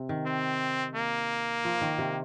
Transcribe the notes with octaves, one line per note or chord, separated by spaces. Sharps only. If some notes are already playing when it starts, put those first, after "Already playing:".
Already playing: C3
D#3
C4
A#3
F3
D#3
C3